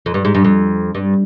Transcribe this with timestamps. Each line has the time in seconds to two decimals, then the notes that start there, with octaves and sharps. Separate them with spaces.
0.06 F2
0.14 G2
0.25 G#2
0.34 G2
0.44 F2
0.95 G2